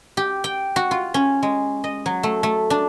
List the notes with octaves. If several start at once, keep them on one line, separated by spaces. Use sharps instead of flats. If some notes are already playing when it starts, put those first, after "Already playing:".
G4
G5
F#4
F4
C#4
G#3
D#5
F#3
A3
A3
D4